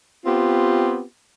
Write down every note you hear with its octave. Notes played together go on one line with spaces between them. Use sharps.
B3 C4 F4 G4